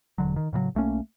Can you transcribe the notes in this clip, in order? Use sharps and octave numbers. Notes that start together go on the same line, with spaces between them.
E1 C#2 D3 F#3
D#3
A2 C#3 E3 F#3
B1 A3 A#3 C#4